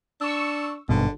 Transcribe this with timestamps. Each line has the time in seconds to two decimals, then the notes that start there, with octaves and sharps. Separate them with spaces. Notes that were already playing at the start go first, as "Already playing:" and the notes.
0.21 D4 C#6 E6
0.89 G#1 G2 B2 D3